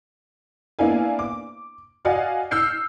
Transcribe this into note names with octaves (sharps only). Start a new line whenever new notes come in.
A#3 B3 D4 E4 F5 G#5
D6
F#4 D5 D#5 F5 F#5 G#5
E6 F6 G6 C7 C#7